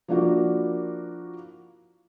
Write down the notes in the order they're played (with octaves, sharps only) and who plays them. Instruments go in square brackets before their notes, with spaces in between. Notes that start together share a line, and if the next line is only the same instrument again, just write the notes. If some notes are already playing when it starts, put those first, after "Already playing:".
[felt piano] F3 A#3 D4 E4 F#4 A#4